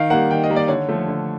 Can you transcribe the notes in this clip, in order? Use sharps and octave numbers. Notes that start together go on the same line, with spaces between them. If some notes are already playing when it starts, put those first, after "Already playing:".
Already playing: D#3 F5
G3 A#3 F#5
D#3 G5
D#5
G3 A#3
D5
D3 C#5
F3 A3
D3